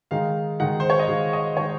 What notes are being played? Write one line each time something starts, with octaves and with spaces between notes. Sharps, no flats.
D#3 G#3 D#4 F5
D#3 G#3 D#4 F#5
C5
C#5
D#5
D#3 G#3 D#4 F5
D#5
D#3 G#3 D#4 C#5